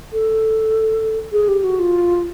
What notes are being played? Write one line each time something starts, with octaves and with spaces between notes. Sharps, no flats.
A4
G#4
G4
F#4
F4